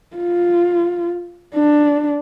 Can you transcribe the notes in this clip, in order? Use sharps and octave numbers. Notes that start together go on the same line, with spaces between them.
F4
D4